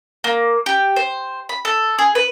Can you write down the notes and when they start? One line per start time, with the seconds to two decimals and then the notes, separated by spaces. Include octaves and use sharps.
0.24 A#3
0.66 G4
0.96 C5
1.49 B5
1.65 A4
1.98 G#4
2.15 B4